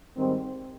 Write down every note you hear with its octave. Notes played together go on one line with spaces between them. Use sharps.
G#2 D#3 G3 C4